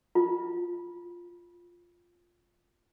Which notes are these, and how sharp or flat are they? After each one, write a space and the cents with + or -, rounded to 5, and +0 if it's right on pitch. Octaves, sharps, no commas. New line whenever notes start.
F4 +0